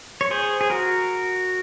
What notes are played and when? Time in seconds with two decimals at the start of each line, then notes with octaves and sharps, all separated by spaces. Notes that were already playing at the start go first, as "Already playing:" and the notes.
0.21 C#5
0.31 G#4 C5
0.61 G#4
0.70 F#4 A#4